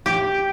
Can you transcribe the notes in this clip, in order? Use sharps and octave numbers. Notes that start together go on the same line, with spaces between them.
G4